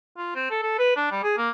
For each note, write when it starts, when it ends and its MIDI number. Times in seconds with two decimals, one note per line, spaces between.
0.17 0.34 65
0.36 0.48 60
0.50 0.62 69
0.62 0.76 69
0.79 0.94 71
0.96 1.09 62
1.11 1.19 55
1.23 1.35 68
1.37 1.50 58